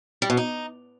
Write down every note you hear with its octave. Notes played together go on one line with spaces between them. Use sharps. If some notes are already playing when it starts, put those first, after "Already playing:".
G3
B2
D#4